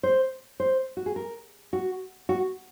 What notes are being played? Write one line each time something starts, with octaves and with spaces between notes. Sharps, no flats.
C5
C5
F#4
G#4
A#4
F#4
F#4